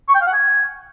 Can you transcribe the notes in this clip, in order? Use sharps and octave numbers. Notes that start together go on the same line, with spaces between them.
C#6
G5
F5
F#5
G#5